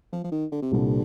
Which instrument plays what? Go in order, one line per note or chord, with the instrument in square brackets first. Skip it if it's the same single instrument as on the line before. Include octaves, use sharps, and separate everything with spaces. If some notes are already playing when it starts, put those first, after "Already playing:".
[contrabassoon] F3
F3
D#3
D3
C3
[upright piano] C2 A#2 G3 C4 [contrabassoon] D3